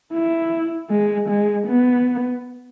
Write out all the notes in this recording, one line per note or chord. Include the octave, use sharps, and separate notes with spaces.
E4
G#3
G#3
B3